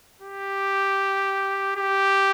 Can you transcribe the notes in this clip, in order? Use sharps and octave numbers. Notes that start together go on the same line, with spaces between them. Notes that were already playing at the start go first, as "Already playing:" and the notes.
G4
G4